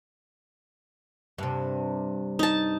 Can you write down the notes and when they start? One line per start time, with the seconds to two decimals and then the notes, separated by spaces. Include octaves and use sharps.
1.38 G2 C3
2.39 D#4 A5